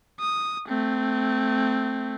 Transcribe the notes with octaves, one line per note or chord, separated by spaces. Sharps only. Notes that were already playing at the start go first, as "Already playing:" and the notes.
D#6
A3 C4